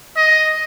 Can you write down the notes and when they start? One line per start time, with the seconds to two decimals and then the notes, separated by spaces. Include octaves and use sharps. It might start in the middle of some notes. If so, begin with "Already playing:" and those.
0.17 D#5